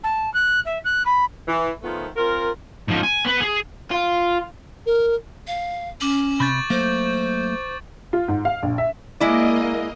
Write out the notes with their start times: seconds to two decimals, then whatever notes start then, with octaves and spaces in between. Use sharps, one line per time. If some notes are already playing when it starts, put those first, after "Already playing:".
0.03 A5
0.34 F#6
0.65 E5
0.84 F#6
1.05 B5
1.48 E3
1.82 D#3 F3 A3 B3 F4
2.16 C4 F4 A#4
2.88 G#2 F3
3.03 G#5
3.25 B3 B4
3.41 G#4
3.91 F4
4.86 A#4
5.47 F5
6.01 C#4 D6 F#7
6.40 C3 B5 C#6 G6 A6
6.70 F#3 A3 A#3 C5
8.13 F4
8.28 G#2
8.45 F5
8.63 A#1
8.78 E5
9.20 G#3 A#3 E4 D5 D#5